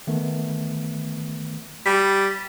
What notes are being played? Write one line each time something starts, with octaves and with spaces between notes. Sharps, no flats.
D#3 A3 B3
G3 B6